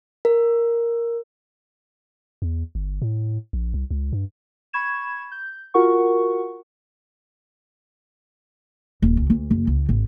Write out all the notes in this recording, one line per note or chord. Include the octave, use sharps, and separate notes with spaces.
A#4
E2
G1
A2
A#1
C2
C#2
G2
B5 C#6 G#6 E7
G6
F4 F#4 A#4 F#5 C#6
D#1
C#2
D2
F#1
C#2
G#1